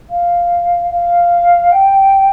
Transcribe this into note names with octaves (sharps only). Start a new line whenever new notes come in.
F5
F5
G5